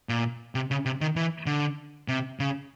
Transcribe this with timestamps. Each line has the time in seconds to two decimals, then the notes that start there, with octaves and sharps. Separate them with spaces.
0.09 A#2
0.55 C3
0.71 C#3
0.86 C3
1.01 D#3
1.16 E3
1.46 D3
2.08 C3
2.40 C#3